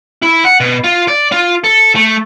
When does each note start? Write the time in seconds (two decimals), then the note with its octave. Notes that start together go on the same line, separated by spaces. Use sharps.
0.22 E4
0.45 F#5
0.60 B2
0.84 F4
1.08 D5
1.32 F4
1.64 A4
1.95 A3